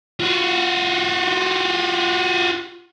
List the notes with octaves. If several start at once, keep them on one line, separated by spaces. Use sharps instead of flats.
F4 F#4